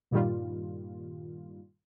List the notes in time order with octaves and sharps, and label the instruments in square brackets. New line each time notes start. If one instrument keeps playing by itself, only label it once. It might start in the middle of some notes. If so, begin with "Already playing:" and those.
[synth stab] G2 A#2 D#3 G3 F4